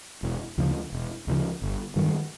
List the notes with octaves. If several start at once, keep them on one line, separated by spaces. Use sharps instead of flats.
E1
D2 C#3 F3
E1
D2 C#3 F3
G1
G2 D#3 F#3